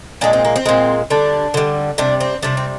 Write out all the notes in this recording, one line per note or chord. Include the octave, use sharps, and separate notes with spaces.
A#2 G#3 D4
C4
A#3
C4
A#2 G#3
D3 G3 D4
D3 G3
C3 G3 D4
C4
C3 G3 D4
C4